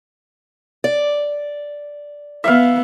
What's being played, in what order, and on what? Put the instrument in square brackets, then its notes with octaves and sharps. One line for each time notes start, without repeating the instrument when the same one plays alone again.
[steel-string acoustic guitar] D5
[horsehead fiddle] B3 [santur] E5 F5